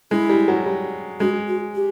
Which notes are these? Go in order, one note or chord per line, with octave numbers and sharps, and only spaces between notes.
G#3 E4
G3
F#3
G3
G#3 F#4
F#4
G4